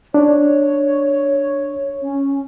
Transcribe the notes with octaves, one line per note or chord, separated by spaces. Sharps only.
D4 C#5
C#4